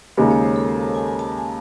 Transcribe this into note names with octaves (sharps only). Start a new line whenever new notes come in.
D#2 C#3 G#3 D#4 C#5
C#5
C5
A4
C5
A5
G#5
G#5
A5
A5
G#5